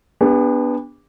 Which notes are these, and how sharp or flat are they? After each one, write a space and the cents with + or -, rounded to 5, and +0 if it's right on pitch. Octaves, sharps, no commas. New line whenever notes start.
B3 +0 D4 -10 G4 +45